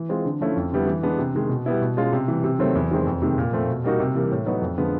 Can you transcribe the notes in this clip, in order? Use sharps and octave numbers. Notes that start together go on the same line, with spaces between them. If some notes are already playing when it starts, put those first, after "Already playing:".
Already playing: E3
G#3 C4 F4
D3
F3 A3 C#4 E4
F2
D3 G3 B3 E4
E3
G#3 B3 D4
C3
D#3 G#3
B2
G3 B3 E4
B2
G#3 C#4 F4
C3
E3 G3
C3
D#3 F#3 A3 C4
E2
C3 D#3 G#3 C4
F2
C3 D#3 G#3
A#2
F3 A3 C4
B2
G3 A#3 D#4 F#4
C3
E3 G3 A#3
A2
F#3 B3 D#4 F#4
F2
D3 F3 G#3 B3